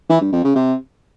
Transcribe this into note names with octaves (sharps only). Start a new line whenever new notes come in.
E3
G2
F2
C#3
C3